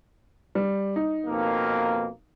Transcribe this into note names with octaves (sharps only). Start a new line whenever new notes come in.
G3
D#4
F2 B2 A#3